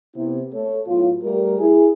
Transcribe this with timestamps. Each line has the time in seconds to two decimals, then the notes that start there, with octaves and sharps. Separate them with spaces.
0.15 C3 B3 E4
0.53 A3 A4 C#5
0.87 A2 F#3 B3 F4
1.23 G3 A3 G4 A#4
1.58 E4 G#4